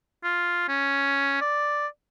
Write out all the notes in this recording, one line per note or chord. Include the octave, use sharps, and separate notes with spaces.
F4
C#4
D5